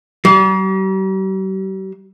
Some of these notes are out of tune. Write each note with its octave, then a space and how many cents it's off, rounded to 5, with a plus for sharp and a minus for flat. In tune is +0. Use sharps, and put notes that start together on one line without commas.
G3 -45